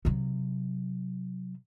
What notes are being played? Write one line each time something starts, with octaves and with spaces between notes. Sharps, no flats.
C3 F#3